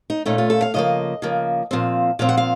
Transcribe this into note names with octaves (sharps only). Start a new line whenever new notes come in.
D#4
A#2 A3 C#4 D#4
F4
A4
F5
C#3 F3 A#3 D#5
C#3 F3 A#3
A#2 F3 C4
A#2 F3 C4 F5
F#5
F5